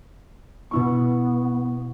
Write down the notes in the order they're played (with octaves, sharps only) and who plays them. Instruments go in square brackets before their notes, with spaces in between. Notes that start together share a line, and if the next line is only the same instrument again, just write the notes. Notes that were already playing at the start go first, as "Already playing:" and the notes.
[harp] B2 E4 C#6 [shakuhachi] B3